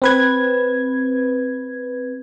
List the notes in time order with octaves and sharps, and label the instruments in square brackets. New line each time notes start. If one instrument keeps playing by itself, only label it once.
[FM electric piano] C4 B4 G#6